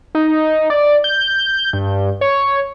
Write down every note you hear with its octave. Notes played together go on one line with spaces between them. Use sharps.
D#4
D5
G6
G2
C#5